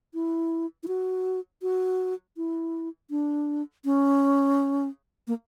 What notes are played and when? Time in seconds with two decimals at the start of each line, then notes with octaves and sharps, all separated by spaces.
0.14 E4
0.83 E4
0.88 F#4
1.62 F#4
2.37 E4
3.10 D4
3.85 C#4
5.28 A#3